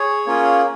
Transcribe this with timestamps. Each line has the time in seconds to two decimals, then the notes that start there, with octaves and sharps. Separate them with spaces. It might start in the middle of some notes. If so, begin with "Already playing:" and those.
Already playing: G#4 C#5
0.27 A#3 C#4 F4 G#4